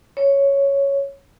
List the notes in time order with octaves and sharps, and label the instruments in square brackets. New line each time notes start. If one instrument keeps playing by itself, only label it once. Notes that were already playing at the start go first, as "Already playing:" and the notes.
[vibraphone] C#5